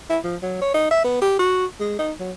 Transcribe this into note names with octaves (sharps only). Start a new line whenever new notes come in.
E4
F3
F#3
C#5
D#4
E5
B3
G4
F#4
G#3
D#4
F#3